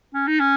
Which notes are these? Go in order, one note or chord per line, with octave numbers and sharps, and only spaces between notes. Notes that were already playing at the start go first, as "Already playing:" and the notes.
C#4
D#4
C#4